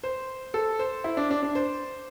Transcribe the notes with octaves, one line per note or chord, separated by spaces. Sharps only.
C5
A4
C5
E4
D4
D4
D4
C5